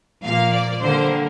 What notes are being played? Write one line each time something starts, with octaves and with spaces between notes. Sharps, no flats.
A#2 F3 A#3 F5
D5
D3 G3 A#3 C5